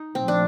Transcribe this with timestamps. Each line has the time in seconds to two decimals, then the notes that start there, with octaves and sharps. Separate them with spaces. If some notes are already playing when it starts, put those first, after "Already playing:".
Already playing: D#4
0.15 A#2 F3 A3 C4
0.28 D4